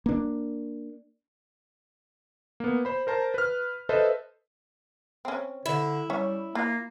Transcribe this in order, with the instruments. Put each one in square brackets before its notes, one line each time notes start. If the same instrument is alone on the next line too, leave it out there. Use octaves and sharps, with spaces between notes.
[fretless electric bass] A#3 D4
[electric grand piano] A#3 B3
C5 B5
A#4 C5 A5 A#5
B4 F6
A4 B4 C5 D#5 E5
[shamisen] C4 C#4
[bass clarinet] D3 [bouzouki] E4
[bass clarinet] G3 [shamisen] C#4 C#5
[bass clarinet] A#3 [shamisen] F4